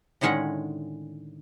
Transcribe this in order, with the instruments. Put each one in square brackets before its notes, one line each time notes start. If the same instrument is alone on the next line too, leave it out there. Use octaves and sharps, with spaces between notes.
[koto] A2 D3 D#3 G#3 C#4 F#5